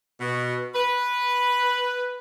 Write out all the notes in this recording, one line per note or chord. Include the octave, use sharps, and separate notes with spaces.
B2
B4